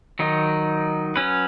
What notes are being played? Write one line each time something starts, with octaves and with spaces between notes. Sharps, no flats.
D#3 F#3 D#4
F#3 C#4 B4